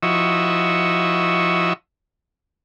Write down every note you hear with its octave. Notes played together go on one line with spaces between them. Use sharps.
F3 E4 F#4 D#5 C#6 E6